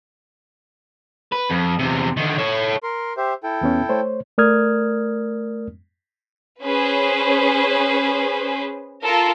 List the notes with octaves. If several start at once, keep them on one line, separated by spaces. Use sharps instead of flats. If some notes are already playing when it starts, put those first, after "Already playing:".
B4
F2
E2 C3
D3 D#3
A4 C#5
A#4 C6
G4 C5 E5
E4 A4 G5
E2 B3 C#4
A3 C5 C#5
A3 A#4 D5 D#6 F6 G#6
C#4 G#4 B4 C5
F4 A4 A#4